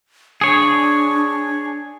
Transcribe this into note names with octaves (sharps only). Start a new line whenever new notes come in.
D4 G#4 C#5